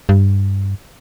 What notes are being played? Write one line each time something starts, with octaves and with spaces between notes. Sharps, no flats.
G2